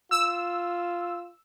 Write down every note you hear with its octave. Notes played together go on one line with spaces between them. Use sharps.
F4 E6